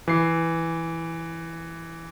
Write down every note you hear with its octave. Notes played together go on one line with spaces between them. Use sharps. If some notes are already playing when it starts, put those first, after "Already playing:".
E3 C7